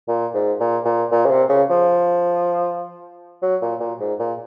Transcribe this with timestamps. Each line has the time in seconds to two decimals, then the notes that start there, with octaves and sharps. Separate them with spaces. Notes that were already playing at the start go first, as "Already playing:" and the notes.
0.08 A#2
0.35 G#2
0.60 A#2
0.85 A#2
1.12 A#2
1.26 C#3
1.31 C3
1.50 C#3
1.70 F3
3.42 F#3
3.62 A#2
3.80 A#2
4.00 G#2
4.19 A#2